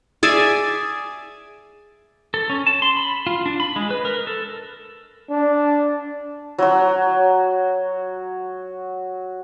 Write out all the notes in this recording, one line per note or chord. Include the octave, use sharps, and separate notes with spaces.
G#4 D5 E5 G#5
A4
C#4
A5
C6
B5
F4
D4
B5
G#3
B4
A#4
A4
D4
F#3 F#4